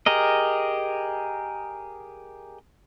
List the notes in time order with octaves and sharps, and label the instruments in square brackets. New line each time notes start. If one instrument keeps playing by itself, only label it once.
[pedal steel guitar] G4 G#4 A#4 D#5